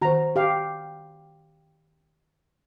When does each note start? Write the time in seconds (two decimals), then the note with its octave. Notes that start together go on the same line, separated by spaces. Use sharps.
0.02 D#3 F#4 C5 A#5
0.36 G4 F5